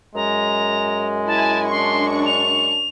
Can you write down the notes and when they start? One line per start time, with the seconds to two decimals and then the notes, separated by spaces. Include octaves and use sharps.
0.15 F#2 G#3 A#5
1.27 E4 G#5 A5
1.70 D4 C6 C#6
2.26 F7